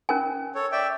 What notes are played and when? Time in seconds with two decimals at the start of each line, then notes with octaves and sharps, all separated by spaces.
0.09 C#4 A#4 G#5
0.55 A4 C#5
0.72 D5 E5 G5